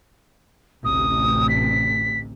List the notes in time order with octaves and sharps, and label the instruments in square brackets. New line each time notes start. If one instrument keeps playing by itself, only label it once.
[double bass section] A1 D2 C3 [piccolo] D#6
[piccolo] B6